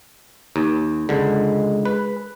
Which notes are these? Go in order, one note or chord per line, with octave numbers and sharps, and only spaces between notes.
D#2
C#2 D3 G#3
B4